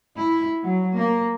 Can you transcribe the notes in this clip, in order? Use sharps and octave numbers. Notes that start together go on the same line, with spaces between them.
E4
F#3
A#3